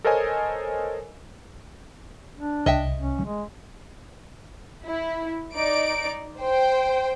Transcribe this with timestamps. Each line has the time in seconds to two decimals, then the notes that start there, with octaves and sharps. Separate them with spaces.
0.04 A4 A#4 C5 C#5 D#5 G#5
2.37 D4
2.66 C2 D#5 E5 G5
2.99 C#4
3.25 G#3
4.84 E4
5.54 D#4 D5 D7
6.39 C5 G5